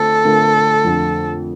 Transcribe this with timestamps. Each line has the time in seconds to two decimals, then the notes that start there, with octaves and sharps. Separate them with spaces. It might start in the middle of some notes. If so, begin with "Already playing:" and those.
Already playing: D3 A3 C4 F4 A4
0.24 D3 A3 C4 F4 A#4
0.84 F2 D3 A3